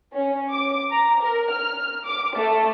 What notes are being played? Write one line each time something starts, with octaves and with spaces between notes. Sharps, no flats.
C#4
D6
A#5
A#4
F6
D6
A3